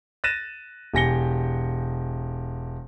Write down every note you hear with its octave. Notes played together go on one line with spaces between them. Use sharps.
F#6 A6 A#6 D#7 E7
E1 G4 G#5 A#6 C#7 G7